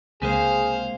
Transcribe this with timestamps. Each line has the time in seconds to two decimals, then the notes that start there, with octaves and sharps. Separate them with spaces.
0.22 C#2 C3 G#3 A#3 G#4 C5 F5